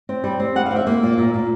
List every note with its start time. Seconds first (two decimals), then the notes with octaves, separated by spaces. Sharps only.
0.09 C4
0.24 G3
0.40 C4
0.55 G3 F#5
0.66 F5
0.71 C4
0.76 E5
0.87 A#3
1.03 A#2
1.18 A#2
1.34 A#2